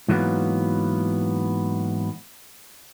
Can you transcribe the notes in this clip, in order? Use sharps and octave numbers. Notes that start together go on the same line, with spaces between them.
G#2 E3 F#3 A#3 B3